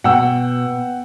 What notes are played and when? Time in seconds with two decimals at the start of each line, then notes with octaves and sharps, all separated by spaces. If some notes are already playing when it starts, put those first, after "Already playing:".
0.04 B2 F#5 G5 E6